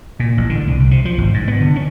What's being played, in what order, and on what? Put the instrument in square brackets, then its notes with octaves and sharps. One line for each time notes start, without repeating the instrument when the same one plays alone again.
[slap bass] A#2
A1
D3
C2
C2
C3
F3
G#1
G#2
B3
D3
C#4